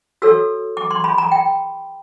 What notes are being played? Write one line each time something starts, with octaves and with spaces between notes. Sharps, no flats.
F#4 A4 C#5 E6
D6
C6
B5
A#5
G5